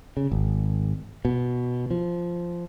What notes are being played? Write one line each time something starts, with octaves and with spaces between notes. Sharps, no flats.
C#3
G#1
B2
F3